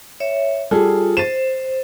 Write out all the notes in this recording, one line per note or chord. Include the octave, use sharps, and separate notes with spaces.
C#5 E5
G3 F4 G#4 A4
C5 A6 D#7 E7